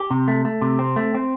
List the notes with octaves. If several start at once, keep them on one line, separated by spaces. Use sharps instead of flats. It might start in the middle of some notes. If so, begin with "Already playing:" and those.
Already playing: G4
C3
A3
A3
C3
C4
A3
C4